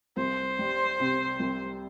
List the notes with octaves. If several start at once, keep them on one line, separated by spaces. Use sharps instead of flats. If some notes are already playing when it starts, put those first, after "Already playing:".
C2 C5
G3
C3
C2